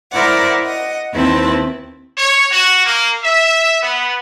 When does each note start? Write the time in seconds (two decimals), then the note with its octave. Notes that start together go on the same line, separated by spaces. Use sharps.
0.12 E4 A#4 C5 D5 F#5
0.65 D#5 F#5
1.13 D#2 D#3 C4 E4 B4 A5
2.18 C#5
2.51 F#4
2.85 A#3
3.23 E5
3.83 B3